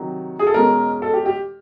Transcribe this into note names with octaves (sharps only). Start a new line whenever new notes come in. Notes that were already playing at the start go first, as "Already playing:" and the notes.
Already playing: C3 D#3 F#3
G#4
A4
E2 B2 G#3 C#4 A#4
A4
G4
G4